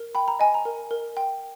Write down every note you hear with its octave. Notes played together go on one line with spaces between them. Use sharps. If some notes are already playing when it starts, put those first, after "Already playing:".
Already playing: A#4
G5 B5
A#5
D#5 G#5
A#5
A#4
A#4
G5